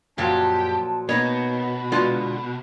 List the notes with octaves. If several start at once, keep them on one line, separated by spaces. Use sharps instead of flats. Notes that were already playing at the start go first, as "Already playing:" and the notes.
F#2 A#2 F3 F#3 G4 A5
B2 A#3 B3 D#4 C#5 D#5 B5
D3 G#3 B3 F4 F#4